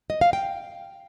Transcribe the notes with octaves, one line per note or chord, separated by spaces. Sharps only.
D#5
F5
G5